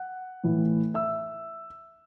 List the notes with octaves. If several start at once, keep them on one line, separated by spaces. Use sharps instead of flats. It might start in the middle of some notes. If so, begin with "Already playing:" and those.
Already playing: F#5 F#6
A2 E3 A3 E4
E5 E6